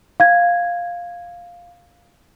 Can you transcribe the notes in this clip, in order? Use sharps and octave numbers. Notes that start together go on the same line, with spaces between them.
F5 G#6